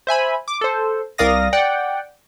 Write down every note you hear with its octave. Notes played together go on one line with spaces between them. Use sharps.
C5 E5 G#5 B5
D6
A4 C5
C2 A#4 D5 F5 D#6 A#6
D5 F#5 G5